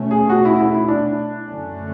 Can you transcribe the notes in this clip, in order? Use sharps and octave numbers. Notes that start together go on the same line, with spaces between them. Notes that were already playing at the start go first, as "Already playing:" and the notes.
Already playing: B2 A3 C#4
G#4
F#4
E4
E4
E4
D4
F#2 D3 A3 C#4